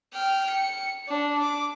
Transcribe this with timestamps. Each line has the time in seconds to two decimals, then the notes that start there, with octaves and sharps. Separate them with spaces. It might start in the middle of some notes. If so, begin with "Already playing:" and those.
0.14 G5 F6
0.51 C#7
1.08 D4
1.41 D6